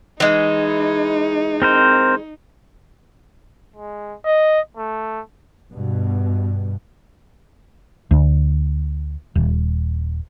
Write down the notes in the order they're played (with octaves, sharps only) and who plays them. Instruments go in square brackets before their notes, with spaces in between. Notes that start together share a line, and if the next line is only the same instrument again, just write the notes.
[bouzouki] E3 G#3 [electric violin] D#4
[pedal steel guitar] C4 A#4 C5
[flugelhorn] G#3
D#5
A3
[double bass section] G2 B2
[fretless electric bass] D2
D#1